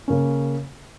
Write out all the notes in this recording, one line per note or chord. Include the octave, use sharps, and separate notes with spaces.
C#3 A#3 C#4